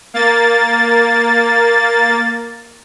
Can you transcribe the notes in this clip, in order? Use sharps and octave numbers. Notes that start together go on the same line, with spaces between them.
A#3 A6